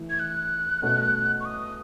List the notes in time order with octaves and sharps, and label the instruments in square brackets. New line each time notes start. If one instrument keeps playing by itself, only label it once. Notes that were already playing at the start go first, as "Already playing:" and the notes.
Already playing: [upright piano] E3 A3 E4
[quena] G#6
F#6
[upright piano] B2 A3 C#4 F#4
[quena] C#6
D#6